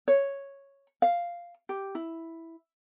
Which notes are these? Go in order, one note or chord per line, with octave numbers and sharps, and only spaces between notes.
C#5
F5
G4
E4